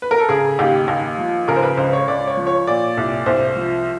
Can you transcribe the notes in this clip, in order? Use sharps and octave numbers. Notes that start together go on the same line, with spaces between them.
B4
A#4
A4
C#3 G#4
D#2 G4
D#2
F3
C#3 A#4
C5
B4
C#2 C5
C#5
C#2 D5
C#5
F3
C#5
A#2 D5
C2
C2 C5
F3